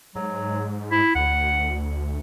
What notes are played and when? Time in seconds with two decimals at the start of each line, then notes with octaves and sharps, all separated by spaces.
0.15 G#2 F#3
0.91 E4
1.15 D2 F#5